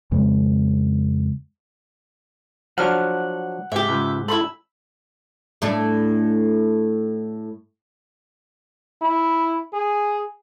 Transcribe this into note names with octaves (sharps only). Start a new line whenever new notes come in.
F2 C#3 G#3
F3 F#3 D4 F#5 F6
G#2 G4 E5
C#2
E4 A4 B5 C6 E6
A2 A3 D4
E4
G#4